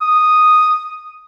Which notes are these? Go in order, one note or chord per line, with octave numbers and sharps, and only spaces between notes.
D#6